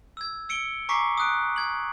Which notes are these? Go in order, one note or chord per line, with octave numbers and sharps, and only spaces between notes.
E6 G#6
E6 C#7 D7 G7
G#5 A#5 C#6 D6 B6 C7
D#6 F#6 D7
G#6 F#7